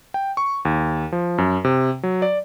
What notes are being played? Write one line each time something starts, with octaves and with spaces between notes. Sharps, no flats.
G5
C#6
D#2
F3
F#2
C3
F#3
D5